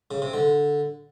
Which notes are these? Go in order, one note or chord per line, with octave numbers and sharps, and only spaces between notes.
C#3
C3
D3